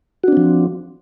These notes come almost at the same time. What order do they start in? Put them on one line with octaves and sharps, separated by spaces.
F#4 D4 C4 F3